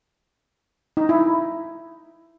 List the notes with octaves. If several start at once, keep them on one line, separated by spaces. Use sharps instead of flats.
D#4
E4